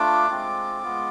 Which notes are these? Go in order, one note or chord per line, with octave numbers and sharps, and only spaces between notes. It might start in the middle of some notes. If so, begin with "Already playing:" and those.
Already playing: A3 D4 F4 D6
G#3 C4 F4
G#3 B3 F4